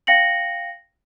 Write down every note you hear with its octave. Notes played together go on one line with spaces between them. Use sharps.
F5 G5 A#6 C#7 F#7